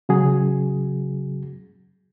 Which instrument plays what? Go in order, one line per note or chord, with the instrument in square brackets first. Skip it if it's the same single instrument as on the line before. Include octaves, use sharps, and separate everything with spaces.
[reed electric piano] C#3 F#3 F#4 G#4